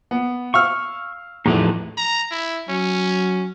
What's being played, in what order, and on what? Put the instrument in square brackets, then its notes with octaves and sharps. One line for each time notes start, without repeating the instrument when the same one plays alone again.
[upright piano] B3
[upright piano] F5 E6 F6 [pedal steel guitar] C#6
[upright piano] E2 [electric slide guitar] A2 F3 A3 [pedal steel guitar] D#4 G4 B4
[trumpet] A#5
E4
[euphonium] F#3 [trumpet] C#4